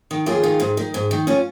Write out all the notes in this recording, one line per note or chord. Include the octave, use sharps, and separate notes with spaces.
D#3
D#2 F4 G#4
D#3
G#2
D#3
G#2
D#3
C#4 F4